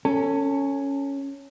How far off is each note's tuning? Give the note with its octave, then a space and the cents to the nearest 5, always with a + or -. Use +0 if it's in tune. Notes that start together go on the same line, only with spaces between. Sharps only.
C#4 +0 A4 +30